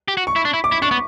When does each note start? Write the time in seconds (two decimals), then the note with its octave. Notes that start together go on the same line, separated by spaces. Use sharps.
0.08 G4
0.17 F#4
0.27 C#6
0.36 E4
0.45 D4
0.54 E4
0.64 D6
0.72 E4
0.82 D4 C#6
0.91 B3